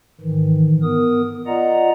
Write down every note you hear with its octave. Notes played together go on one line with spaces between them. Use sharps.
G#2 D#3 E3
B3 A#4 D#6
F4 D5 D#5 F#5 A#5